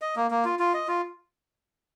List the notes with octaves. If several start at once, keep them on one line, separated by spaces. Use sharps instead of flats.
D#5
A#3
A#3
F4
F4
D#5
F4